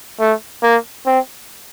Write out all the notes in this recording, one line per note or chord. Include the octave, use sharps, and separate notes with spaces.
A3
A#3
C4